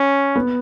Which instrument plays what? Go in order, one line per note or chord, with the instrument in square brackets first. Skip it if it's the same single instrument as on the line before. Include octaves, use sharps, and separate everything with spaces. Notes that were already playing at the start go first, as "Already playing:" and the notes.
Already playing: [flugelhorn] C#4
[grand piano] B3